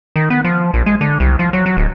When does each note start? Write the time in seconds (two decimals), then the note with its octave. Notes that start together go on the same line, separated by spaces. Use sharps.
0.16 D#3
0.30 B3
0.44 F3
0.74 A#1
0.86 G#3
1.01 D3
1.20 C2
1.39 F3
1.53 F#3
1.66 F#3
1.77 D1